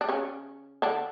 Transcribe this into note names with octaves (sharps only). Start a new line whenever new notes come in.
D4
C#3 C#4
D3 D4